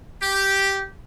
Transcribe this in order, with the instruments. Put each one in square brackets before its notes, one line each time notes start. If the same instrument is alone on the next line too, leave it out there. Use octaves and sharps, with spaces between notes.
[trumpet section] G4